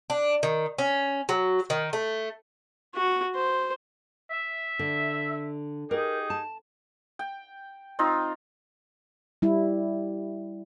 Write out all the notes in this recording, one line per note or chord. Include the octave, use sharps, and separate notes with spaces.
D4
D#3
C#4
F#3
D#3
A3
F#4
C5
E5
D3
D#4 G4 G#4 A#4
A5
G5
C4 D#4 F4
G3 E4